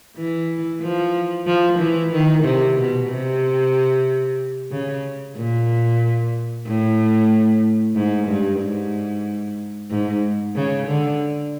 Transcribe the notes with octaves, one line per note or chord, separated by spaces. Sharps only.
E3
F3
F3
E3
D#3
C3
B2
C3
C#3
A#2
A2
G#2
G2
G#2
G#2
C#3
D3